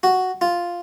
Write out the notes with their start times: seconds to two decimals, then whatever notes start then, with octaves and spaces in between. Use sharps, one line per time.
0.03 F#4
0.41 F4